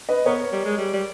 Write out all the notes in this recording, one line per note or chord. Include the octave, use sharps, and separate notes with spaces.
B4 D#5
B3 A#4 C#5
G3
G#3
G3
G3